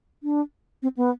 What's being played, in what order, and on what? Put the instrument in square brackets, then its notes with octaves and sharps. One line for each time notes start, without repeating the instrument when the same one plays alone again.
[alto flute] D4
C4
B3